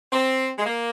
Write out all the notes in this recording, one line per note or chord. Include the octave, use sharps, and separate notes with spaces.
C4
G#3
A#3